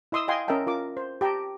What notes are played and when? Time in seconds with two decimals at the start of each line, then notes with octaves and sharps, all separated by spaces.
0.12 E4 D#5 C6 D#6 E6
0.28 D#5 F5 G5 G#5 C6
0.48 C#4 A#4 D#5 E5 G5 A5
0.67 F4 A#4 D6
0.97 C5
1.21 G4 G5 A5 A#5